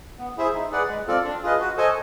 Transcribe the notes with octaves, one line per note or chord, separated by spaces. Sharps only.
B3
E4 G#4 C5 E5
D#4
G#4 B4 D5 F#5
G#3
C4 F4 A4 D5
D4
F4 G#4 B4 D#5
F#4
A4 C5 D#5 G#5